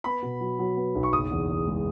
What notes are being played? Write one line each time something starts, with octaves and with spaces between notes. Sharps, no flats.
B3 B5
B2
F#3
F#3
B3
B1
C#6
F#1 D#6
E2
E2
G#3